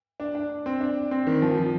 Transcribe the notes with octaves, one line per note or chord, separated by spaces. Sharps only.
D4
D4
C4
D4
C4
D#3
F3
F3